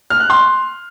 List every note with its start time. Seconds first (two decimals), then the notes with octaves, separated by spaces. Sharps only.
0.10 F6
0.20 F#6
0.30 C6